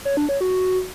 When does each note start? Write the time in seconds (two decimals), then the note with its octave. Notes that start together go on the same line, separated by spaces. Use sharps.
0.05 C#5
0.17 D4
0.29 C#5
0.41 F#4